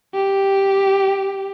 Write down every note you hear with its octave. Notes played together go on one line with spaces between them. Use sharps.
G4